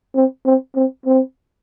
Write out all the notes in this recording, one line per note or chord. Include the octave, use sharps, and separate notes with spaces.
C4
C4
C4
C4